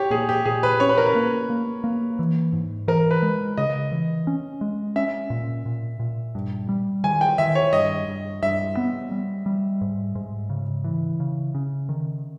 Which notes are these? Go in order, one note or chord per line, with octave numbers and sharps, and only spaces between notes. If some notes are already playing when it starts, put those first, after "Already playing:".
Already playing: G4 C#5
A#2 G#4
G4
A#2 G#4
B4
C#4 C#5
B4
A#4
B4
A#3
A#3
A#3
E3
G#2
E3 A#4
B4
G#3
C#3 D#5
E3
C#4
G#3
C#4 E5
A#2
A#2
A#2
G2
G3
D#3 G#5
G5
D#3 E5
C#5
G2 D#5
G2
G2 E5
B3
G3
G3
G#2
G#2
C#3
E3
C#3
C#3
D#3